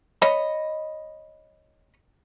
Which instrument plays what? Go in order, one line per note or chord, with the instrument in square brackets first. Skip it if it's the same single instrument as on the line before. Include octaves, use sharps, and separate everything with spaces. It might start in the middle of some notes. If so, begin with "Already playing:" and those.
[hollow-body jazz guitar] C#5 D#5 B5